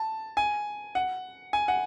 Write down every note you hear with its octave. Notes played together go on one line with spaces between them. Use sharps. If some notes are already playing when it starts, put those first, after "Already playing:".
Already playing: A5
G#5
F#5
G#5
F#5